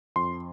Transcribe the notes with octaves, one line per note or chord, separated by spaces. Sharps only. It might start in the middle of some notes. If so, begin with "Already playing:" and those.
F2 C6